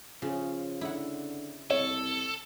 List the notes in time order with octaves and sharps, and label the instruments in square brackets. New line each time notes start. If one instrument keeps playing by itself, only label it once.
[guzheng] C#3 [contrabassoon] F3
[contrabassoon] D3 [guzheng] E4 F#5
[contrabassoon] C2 [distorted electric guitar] A4 [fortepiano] C#5